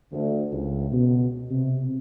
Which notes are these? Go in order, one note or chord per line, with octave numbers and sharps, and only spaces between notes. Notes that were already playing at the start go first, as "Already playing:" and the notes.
D2
C#2
B2
C3